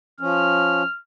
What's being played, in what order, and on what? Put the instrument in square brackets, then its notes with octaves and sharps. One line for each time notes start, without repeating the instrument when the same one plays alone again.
[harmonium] F3 C#4 [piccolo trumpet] F6